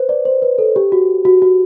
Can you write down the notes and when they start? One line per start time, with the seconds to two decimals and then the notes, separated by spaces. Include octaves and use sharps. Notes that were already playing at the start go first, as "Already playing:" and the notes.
Already playing: B4 C5
0.09 D5
0.25 C5
0.42 B4
0.58 A4
0.76 G4
0.92 F#4
1.25 F#4
1.42 F#4